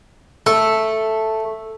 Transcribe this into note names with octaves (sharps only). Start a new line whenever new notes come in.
A3 A4